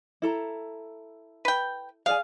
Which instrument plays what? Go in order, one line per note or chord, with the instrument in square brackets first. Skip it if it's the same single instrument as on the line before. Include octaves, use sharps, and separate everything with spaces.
[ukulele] E4 A4 A#5
[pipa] B4 G5
[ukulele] G#4 D5 G#5 [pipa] F5